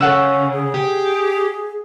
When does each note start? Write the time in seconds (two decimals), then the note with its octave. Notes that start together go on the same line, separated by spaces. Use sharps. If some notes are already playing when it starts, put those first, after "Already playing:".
0.01 C#3 C#4 A4 F#5 E6
0.53 G#4
0.74 G4